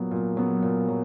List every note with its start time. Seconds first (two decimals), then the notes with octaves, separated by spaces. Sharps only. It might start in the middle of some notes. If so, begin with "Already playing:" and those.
Already playing: A#2 F#3 B3
0.11 A#2
0.37 F#3 B3
0.62 A#2
0.88 F#3